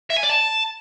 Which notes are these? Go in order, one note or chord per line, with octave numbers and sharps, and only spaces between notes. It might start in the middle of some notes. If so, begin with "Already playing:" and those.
E5
G#5
D5
A5